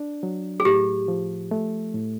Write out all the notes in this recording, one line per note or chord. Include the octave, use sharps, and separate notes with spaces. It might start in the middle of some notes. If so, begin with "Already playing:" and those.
Already playing: D4
F#3
G#4
A2 G4
F3
A3
A2